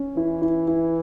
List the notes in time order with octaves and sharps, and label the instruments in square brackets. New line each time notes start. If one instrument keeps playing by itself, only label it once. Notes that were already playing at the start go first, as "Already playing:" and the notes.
Already playing: [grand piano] C#4
[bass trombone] E3 [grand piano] E4
[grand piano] E4
E4